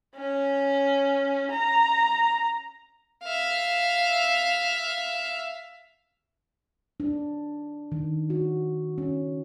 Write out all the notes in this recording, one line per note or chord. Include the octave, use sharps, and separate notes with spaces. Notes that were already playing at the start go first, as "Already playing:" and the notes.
C#4
A#5
E5 F5
D4
D#3
F#4
C#4